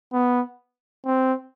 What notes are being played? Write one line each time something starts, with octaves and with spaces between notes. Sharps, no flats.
B3
C4